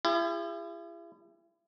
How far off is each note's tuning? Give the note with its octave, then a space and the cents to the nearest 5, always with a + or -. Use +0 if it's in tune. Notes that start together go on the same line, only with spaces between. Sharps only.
E4 +40 G#4 -45